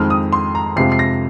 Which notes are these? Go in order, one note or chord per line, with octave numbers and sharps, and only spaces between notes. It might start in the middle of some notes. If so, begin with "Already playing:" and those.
Already playing: F2 D#3 G#3 C4 F6
D#6
C6
A#5
F2 C3 G#3 C4 F4 C7
C7
A#6